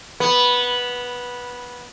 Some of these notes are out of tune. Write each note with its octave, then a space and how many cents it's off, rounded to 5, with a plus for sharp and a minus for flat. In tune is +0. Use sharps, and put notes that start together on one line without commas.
B3 -10